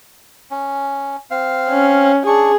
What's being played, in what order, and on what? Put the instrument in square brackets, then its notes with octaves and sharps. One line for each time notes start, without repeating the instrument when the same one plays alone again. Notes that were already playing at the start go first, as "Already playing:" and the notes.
[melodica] C#4
C4 F5
[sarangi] C#4
[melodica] D4 C#6 [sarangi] G#4